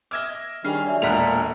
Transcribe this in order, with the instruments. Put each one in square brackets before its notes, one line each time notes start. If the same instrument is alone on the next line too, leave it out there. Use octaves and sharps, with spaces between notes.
[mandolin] D#5 E5 D6 [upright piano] F6 G#6
[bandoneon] D#3 G3 [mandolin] C#4 G#4 F5 [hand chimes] D4
[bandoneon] F#3 [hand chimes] D5 E5
[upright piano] E1 G#3 F7 [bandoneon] A#2 A#4 [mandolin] A4 F#5 B5